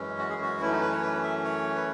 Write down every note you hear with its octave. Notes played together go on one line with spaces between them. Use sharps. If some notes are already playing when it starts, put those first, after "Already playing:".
Already playing: F#2 E3 G#3 C#4
F#4
G#4
F#4
F#2 E3 A3 C#4 E4
D#4
B4
C#5
B4
E5
C#5
B4